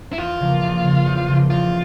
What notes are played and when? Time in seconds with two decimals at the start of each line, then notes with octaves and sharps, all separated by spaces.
0.13 E4
0.18 E2 F4
0.40 C#3 F3 A#3
0.62 E2
0.83 C#3 F3 A#3
1.06 E2
1.28 C#3 F3 A#3
1.49 E2 F4